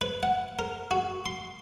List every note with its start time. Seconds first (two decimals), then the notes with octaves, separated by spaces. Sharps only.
0.01 B4
0.23 F#5
0.59 A#4
0.91 F#4
1.26 C6